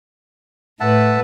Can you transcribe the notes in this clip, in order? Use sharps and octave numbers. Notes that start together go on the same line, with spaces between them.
A2 A3 B4 E5 F#5 A5